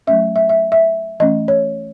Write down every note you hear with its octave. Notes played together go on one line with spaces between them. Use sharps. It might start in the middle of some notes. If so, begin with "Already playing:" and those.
F#3 A3 C#4 E5
E5
E5
E5
E3 A3 C#4 D#5
C#5